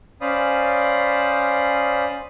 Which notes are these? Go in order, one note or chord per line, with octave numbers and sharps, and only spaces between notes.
C#4 C5 D5 F5 B5 D#6